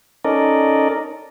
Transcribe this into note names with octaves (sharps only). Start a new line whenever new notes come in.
C#4 D#4 A4 A#4 D5 D#5